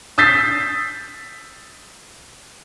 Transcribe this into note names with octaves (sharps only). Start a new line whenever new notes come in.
D#6 E6 G6 A6 B6 C7